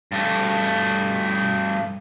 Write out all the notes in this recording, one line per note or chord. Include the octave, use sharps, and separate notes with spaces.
G2 A3